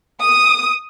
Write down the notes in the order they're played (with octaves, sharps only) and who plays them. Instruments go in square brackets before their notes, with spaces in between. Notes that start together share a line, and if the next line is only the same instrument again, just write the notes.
[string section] D#6